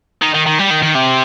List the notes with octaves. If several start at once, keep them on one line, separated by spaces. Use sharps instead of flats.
D#3
D#3
D#3
G3
D#3
D#3
C3